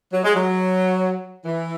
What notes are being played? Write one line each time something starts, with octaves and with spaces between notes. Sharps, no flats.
F#3
G#3
F#3
E3